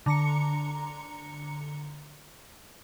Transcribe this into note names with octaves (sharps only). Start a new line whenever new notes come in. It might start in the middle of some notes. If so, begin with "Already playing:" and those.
D3 A#5 C#7